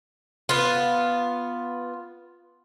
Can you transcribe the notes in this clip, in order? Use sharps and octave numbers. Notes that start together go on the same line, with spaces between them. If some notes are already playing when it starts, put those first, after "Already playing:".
B3 F4